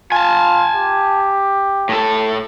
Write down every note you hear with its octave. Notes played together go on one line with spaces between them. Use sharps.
F4 G#5 A5
G4
A2 A4